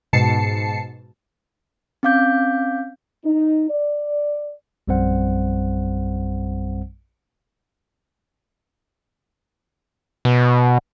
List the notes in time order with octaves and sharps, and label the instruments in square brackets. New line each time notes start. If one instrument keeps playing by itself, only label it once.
[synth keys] G#2 B2 A5 C7 C#7
[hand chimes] C4 C#4 F5 D6 G6
[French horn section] D#4
D5
[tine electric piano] A#1 F#2 G3 C4 C5 F#5
[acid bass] B2